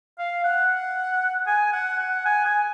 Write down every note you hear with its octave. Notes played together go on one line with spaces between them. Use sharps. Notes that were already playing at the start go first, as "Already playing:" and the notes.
F5
F#5
G#5
F#5
F#5
G#5
G#5